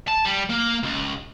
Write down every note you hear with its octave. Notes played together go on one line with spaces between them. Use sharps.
A5
G3
A#3
C#2